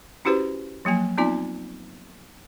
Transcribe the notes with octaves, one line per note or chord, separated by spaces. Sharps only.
C#4 E4 F#4 G4 B4 C5
F3 F#3 A#3 G#5
B3 C4 D#4 F4 D5 G#5